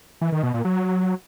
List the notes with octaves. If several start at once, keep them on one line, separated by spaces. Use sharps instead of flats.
E3
D#3
B2
A#2
F#3